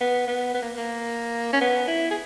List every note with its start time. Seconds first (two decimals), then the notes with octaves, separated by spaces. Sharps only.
0.01 B3
0.28 B3
0.54 B3
0.62 A#3
0.77 A#3
1.53 C#4
1.61 B3
1.88 E4
2.11 G#4